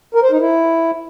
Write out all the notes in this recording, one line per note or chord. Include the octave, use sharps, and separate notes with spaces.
A#4
C5
D#4
E4